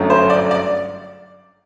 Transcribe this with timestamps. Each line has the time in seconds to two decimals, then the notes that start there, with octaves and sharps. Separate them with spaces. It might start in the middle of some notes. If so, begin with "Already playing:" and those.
Already playing: G1 F#2 F#3 A3
0.10 C5
0.30 D5
0.51 D5